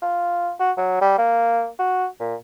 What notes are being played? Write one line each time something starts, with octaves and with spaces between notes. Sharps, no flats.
F4
F#4
F#3
G3
A#3
F#4
A#2